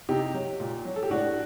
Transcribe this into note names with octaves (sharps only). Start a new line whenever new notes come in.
C3 D#4 G4
F#3
A#2
F#3
A4
G4
A2 D4 F#4